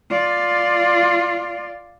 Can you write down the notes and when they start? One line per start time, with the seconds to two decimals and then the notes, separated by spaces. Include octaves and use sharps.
0.10 F4 D5